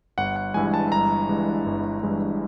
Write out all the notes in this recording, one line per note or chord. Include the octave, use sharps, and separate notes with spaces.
G1 F#5
F#5
G2 E3 G#3 G#5
A5
G1 A#5
G2 E3 G#3
G1
G2 E3 G#3